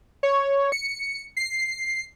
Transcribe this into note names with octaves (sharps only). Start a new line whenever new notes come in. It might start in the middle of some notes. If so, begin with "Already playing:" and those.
C#5
C#7
C7